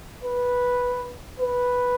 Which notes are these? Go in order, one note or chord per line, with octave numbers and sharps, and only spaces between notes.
B4
B4